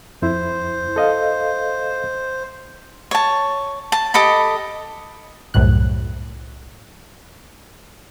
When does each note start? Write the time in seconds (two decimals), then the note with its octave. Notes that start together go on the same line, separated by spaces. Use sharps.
0.22 F2 E4 C5
0.96 A4 D#5 F5
3.11 C#5 A5
3.92 A5
4.14 G4 A4 D#5 B5
5.54 C2 F#2 A2 F#6